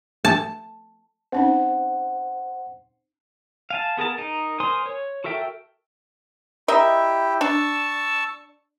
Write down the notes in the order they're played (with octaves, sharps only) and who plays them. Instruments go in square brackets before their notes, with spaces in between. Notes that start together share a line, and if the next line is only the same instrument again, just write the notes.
[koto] A5
[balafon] C4 C#4 D#4 [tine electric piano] C5 F#5
[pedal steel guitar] F5 G#5 A5
B3 G#4 A#4 A5
D#4 A#4
A#4 C5 G#5 C6 D#6
C#5
F#4 A4 A#4 E5 G5
[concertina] E4 G4 [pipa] A#4 D#5 E5
[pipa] D4 [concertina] A5 C#6 E6